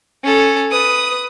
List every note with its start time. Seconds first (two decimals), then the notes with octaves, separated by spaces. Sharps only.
0.24 C#4 A4
0.71 B4 D#6